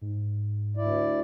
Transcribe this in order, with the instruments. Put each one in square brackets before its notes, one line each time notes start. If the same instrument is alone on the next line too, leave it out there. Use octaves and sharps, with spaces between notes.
[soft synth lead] G#2
[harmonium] D2 E4 D5